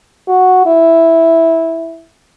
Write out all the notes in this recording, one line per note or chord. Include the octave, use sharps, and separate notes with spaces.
F#4
E4